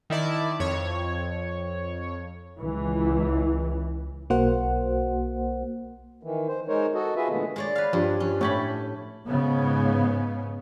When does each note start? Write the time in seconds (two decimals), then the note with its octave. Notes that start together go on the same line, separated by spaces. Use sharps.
0.10 D#3 E4 D5 A5
0.60 F2 C#5
2.60 C#2 E3
4.30 B1 A#3 F#4 C5 F#5
6.23 D#3 E3
6.48 C5
6.68 G#3 D#4 A#4 C5 C#5
6.94 F#4 A4 D#5
7.16 F4 F#4 G#4 B4 D#5 E5
7.29 A#2 D3 E3 G#3 A3 B3
7.56 G#3 C#5 D5
7.76 B4 F5
7.93 G2 F3
8.20 F3 C#4
8.41 A2 A3 C#4 G4 C#5 B5
9.27 G#2 C#3 B3